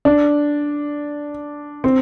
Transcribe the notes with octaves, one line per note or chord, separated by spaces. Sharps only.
D4
C4